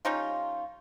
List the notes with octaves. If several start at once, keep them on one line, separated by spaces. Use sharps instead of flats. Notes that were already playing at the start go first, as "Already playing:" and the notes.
G3 C#4 D#4 F4